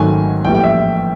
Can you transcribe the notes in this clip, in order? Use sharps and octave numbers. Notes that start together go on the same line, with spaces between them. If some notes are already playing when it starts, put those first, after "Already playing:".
Already playing: G#1 G#2 D#3 F#3 A3 G#5
A#1 A2 E3 G3 G5
G5
E5